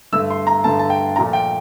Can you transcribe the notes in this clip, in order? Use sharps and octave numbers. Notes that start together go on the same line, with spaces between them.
G2 D3 A3 E6
C6
A#5
G2 D3 A3 A5
A5
G5
A#2 F3 A3 A#5
G5